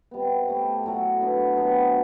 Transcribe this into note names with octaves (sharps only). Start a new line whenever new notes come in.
C3 G3 B3
A3 E4 G4
A2 F#3 A3
F#3 B3 D4
C3 F#3 B3